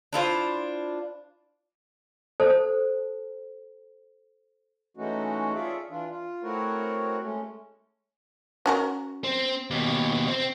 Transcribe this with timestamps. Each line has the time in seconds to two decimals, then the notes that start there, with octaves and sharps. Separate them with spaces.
0.13 D4 E4 F4 C5
2.40 A4 C5 A5
4.96 E3 G#3 A3 C#4 D#4 F#4
5.54 C#4 F4 G#4 A4 D5 E5
5.90 E3 D4 F4
6.09 F4
6.43 A3 C4 E4 F#4 A#4 C#5
7.22 G#3 A3 C#4
8.66 C#4 F#4 A#4
9.24 C4
9.70 D#2 B2
10.28 C4